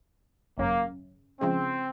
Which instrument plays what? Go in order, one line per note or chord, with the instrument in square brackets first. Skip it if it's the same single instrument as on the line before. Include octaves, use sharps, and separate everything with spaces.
[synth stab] G#1 F#2 C#3 [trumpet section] A#3
[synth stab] C#3 F3 G#3 [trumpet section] C4